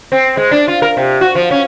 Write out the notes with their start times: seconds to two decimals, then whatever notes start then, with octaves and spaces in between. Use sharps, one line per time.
0.12 C4
0.37 G#3
0.51 D4
0.68 F4
0.82 A#4
0.97 C3
1.21 F#4
1.35 F3
1.51 C#4